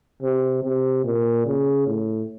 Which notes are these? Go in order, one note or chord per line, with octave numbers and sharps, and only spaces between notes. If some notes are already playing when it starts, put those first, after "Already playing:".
C3
C3
A#2
C#3
A2